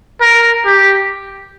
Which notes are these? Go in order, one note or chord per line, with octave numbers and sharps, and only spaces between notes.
A#4
G4